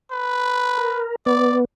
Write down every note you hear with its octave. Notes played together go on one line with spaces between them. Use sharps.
B4
A#4
B3 D5